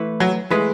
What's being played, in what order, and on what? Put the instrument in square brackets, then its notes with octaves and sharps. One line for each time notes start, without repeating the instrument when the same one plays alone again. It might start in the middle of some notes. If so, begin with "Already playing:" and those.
Already playing: [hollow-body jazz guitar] E3 A3 E4 B4
[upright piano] F#3
[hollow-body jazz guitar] E3 A3 E4 B4 [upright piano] G#3